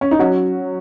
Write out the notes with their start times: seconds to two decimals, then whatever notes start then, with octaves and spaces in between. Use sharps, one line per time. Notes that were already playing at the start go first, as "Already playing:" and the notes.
0.01 C#4
0.11 D#4
0.19 F#3 C#4 F#4